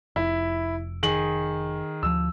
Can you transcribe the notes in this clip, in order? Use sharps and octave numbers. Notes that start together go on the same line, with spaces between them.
F1 E4
D#3 G#4 F#7
D2 F3 E6